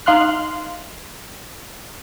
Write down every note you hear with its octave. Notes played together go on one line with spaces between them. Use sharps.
D#4 F5 C6 F6 F#6